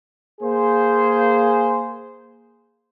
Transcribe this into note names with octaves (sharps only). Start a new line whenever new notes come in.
A#3 G#4 C5